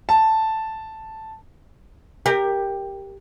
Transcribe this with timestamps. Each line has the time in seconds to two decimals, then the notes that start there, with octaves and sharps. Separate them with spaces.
0.09 A5
2.26 G4 A#4